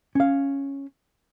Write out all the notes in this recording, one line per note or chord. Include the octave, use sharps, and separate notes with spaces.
C#4 F5